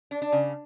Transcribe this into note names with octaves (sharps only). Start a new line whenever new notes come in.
D4
D4
C#3